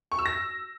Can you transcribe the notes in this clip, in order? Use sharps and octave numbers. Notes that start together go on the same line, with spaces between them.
C#6
E6
A#6